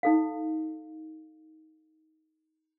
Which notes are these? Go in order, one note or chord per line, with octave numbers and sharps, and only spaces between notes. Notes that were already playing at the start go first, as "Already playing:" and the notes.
D#4 A4 F5